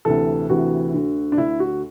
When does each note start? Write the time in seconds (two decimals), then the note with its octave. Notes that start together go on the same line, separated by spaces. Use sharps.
0.05 D2 C3 E3 A4
0.49 D2 C3 E3 F#4
0.94 D2 D3
1.32 D4
1.37 D2 D3 E4
1.60 F#4